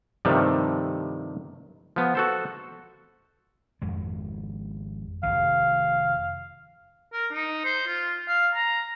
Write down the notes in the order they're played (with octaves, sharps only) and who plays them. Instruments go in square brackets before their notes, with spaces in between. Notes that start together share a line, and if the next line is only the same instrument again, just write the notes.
[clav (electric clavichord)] G2 C3 D#3 F3 G3 A3
F3 B3
F#4 A4 C5
[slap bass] G#1 F2 G#3
[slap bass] F1 A#1 D#3 [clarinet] F5
[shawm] A#4
D#4
C5
F4
F5
A#5